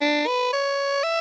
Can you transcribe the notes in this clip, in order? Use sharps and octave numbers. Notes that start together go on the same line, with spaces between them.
D4
B4
C#5
E5